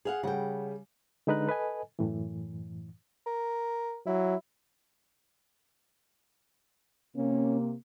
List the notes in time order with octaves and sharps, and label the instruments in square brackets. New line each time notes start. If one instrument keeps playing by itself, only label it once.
[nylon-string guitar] G#4 F5 F#5
[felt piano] C#3 G3 [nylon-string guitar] F#5 G5
[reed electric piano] D3 G#3 D#4 B4 A#5 F#6
A4 B4 D#5 G#5
F#2 A2 E3
[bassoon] A#4
[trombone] F#3 [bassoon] E4
[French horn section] C3 A#3 [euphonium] C#4